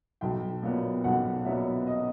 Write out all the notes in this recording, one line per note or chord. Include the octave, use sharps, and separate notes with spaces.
B1 G5
A#2 F#3 B3
B1 F#5
A#2 F#3 B3 E5
D#5